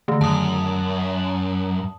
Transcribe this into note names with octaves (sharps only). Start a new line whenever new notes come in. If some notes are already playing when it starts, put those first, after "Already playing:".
D3 D#3 A3
F#2 A5 D#6